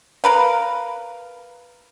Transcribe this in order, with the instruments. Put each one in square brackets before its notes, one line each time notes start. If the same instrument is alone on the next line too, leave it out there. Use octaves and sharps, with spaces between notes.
[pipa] A#4 B4 F5